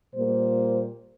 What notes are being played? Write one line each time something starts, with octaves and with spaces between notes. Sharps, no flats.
A#2 G3 A#3 C5